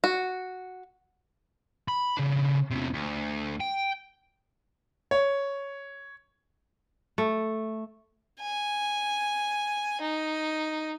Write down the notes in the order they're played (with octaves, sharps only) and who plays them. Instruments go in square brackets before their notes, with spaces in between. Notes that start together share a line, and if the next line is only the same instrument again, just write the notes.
[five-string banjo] F#4
[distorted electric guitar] B5
C#3 D4
E2 C3
D2
G5
[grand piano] C#5
[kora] A3
[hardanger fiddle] G#5
D#4